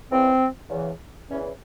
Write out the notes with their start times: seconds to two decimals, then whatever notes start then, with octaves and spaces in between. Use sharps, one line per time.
0.11 E2 C#3 E3 C4
0.70 E2 C#3 E3
1.28 E2 C#3 E3 C#4